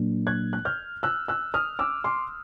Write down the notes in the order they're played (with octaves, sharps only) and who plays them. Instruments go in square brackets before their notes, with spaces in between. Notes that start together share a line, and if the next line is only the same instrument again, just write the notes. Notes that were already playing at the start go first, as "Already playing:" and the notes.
Already playing: [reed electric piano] A#2 F#3 A#3 D4
[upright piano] F#6 G#6
F#6
F6 G6
E6 F#6
E6 F#6
D#6 F6
D6 E6
C6 D6